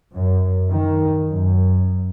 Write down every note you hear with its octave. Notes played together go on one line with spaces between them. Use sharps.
F#2
D#3
F#2